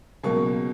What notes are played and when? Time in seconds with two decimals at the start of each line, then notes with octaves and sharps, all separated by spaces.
0.23 C#2 B2 F#3 A#3 C#6